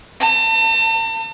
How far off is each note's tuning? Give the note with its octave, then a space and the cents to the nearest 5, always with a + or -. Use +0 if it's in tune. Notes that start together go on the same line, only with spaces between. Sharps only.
A5 +40